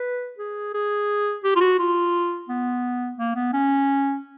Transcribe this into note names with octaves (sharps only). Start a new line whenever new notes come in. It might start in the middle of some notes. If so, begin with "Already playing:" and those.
Already playing: B4
G#4
G#4
G4
F4
F#4
F4
B3
A#3
B3
C#4